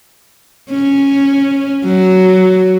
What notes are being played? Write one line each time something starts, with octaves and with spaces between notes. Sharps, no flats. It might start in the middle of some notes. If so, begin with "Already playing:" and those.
C#4
F#3